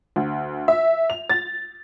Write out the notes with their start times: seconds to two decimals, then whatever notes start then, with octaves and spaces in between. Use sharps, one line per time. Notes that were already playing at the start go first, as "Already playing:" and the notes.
0.16 D2
0.68 E5
1.10 F7
1.30 A6